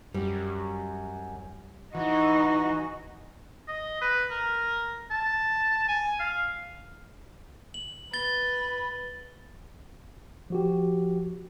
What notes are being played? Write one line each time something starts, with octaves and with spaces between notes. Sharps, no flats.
F#2 G3
E3 D#4 F#4
D#5
B4
A#4
A5
G#5
F5
F#7
B4 A6 G7
F3 F#4 G4